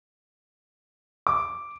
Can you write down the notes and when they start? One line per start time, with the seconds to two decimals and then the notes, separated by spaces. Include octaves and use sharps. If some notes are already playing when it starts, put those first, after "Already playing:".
1.27 D6